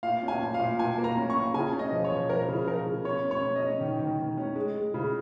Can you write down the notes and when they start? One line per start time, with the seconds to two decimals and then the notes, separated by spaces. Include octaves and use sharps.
0.03 A#2 F5
0.23 C#4
0.28 G#5
0.41 A#2
0.54 F5
0.60 A#2
0.79 A#2 G#5
0.98 A#3
1.04 A#5
1.17 C#4
1.30 C#6
1.36 A#2
1.54 C#3 G#5
1.73 C#4
1.79 D#5
1.92 F3
2.04 C#5
2.12 F3
2.29 F3 A#4
2.48 C#3
2.67 F3 A#4
2.87 C#3
3.05 C#4 C#5
3.25 C#4
3.31 C#5
3.42 C#4
3.56 D#5
3.62 C#4
3.81 D#3
3.99 D#3
4.19 D#3
4.37 C#4
4.56 G#3
4.75 G#3
4.94 C#3